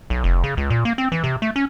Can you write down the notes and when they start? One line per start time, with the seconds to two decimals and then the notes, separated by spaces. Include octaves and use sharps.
0.10 B1
0.24 F1
0.44 C#3
0.57 C#2
0.70 A#2
0.85 A#3
0.98 C4
1.12 E3
1.24 C3
1.42 A3
1.56 C#4